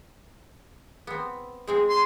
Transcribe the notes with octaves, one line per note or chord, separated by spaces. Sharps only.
B3 C4
G#3 C4 G#4
C6